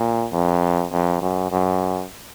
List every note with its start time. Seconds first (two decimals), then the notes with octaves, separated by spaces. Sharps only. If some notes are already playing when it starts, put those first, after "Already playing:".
Already playing: A#2
0.33 F2
0.92 F2
1.22 F#2
1.51 F#2